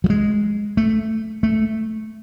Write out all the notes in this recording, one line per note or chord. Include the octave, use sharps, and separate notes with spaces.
F#3
G#3
A3
A3